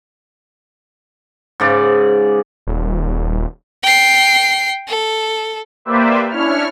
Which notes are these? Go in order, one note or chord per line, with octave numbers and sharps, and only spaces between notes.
G#2 C#3 D5
D#1
G5 C7
A4
A#3 G4 B4 C5 D5 E5
C#4 D4 E4 C#5 F6